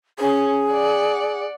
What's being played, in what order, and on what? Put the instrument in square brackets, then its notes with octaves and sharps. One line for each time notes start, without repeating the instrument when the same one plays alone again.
[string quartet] C#4 [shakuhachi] G#4
[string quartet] D5 F#5